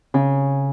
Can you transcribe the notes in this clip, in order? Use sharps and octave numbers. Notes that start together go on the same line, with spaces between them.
C#3